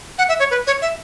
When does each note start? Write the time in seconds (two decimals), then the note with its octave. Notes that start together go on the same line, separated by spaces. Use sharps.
0.18 F#5
0.29 E5
0.40 C#5
0.51 B4
0.67 C#5
0.82 E5